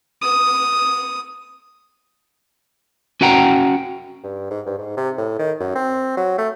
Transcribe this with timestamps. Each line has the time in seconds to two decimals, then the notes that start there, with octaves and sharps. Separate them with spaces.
0.23 D#6
3.21 C#4 F#4 F#5 G5 A#5
4.23 G2
4.51 G#2
4.66 G2
4.78 G#2
4.97 C3
5.18 A2
5.39 D#3
5.60 F#2
5.75 C4
6.17 F#3
6.38 A3